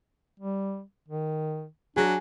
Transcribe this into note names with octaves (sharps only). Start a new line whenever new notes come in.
G3
D#3
F#3 D4 G#4 A#6